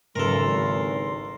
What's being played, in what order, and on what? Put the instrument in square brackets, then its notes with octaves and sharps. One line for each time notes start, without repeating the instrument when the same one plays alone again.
[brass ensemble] G#1 [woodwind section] E2 C6 [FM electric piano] G#2 C#3 F#3 [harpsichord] A4 A#4